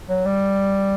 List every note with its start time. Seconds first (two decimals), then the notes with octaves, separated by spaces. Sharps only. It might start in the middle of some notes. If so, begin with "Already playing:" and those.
0.09 F#3
0.26 G3